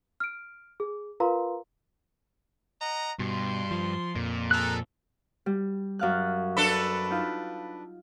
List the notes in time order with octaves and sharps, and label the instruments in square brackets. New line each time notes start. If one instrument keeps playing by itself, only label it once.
[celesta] F6 D7
G#4
F4 A#4 B4 F5 A#5 C6
[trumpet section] D#5 F#5 A#5
[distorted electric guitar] G2 [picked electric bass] B2 [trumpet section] C6
[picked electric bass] F3
[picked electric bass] F2 [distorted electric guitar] A#2
[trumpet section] G#4 A4 [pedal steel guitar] A#5 F#6
[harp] G3
F#2 F5 F#6
[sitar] D4 A4 B4
[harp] D#4 F4